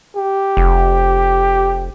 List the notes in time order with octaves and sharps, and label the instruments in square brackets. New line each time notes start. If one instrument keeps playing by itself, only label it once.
[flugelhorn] G4
[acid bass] F1